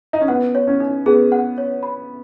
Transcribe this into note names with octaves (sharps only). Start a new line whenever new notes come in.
D#4
C#4
B3 F#5
C#5
C#4
D#4
B3 G#4
F#5
C#5
B5